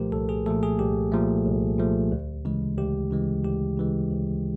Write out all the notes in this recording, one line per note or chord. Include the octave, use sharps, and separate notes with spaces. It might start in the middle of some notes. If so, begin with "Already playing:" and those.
Already playing: C2 A#2 F3 A3 G4 A#4 C5
C2 A4
G#4
A#2 F3 A3 A4
G#4
C2 G4
A#2 F3 A3
C2
A#2 F3 A3
D2
C#3 E3 G#3
D2 G4
C#3 E3 G#3
D2 G4
C#3 E3 G#3
D2